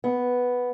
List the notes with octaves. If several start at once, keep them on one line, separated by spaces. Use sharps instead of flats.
B3